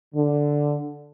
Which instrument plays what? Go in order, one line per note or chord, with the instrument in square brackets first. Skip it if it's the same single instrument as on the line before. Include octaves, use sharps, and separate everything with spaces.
[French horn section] D3